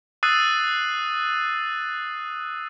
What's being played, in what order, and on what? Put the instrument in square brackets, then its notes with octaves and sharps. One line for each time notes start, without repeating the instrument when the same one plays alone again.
[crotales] D#6 E6 F#6 A6 C7 D#7